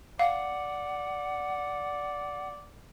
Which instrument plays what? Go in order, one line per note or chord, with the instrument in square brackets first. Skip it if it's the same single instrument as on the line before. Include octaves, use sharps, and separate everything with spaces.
[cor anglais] D5 [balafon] F5 [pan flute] F#5